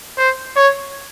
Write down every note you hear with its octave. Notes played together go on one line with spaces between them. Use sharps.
C5
C#5